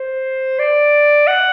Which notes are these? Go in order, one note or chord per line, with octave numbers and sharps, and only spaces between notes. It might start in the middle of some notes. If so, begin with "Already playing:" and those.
Already playing: C5
D5
F#5